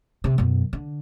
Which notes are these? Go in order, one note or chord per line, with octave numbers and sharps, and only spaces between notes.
C3
F#2 B2
D3